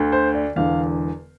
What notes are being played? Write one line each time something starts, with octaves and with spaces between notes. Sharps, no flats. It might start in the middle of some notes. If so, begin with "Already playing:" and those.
Already playing: D2 D3
C5
D5
E1 E2 D3 F5